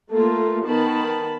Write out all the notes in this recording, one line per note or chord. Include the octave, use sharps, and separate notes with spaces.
A3 A#3 F4 A4
D#3 B3 A5 B5